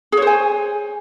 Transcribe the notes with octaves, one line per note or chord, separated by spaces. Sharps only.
G#4 C5 C#5 G#5